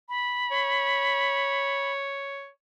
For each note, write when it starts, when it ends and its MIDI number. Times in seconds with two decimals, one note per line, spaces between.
0.09 1.92 83
0.51 2.49 73